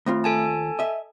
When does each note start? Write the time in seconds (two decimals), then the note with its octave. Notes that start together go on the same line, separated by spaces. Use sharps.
0.06 D#2 A3 C4 F4
0.24 A4 G#5 A5
0.79 D#5 E5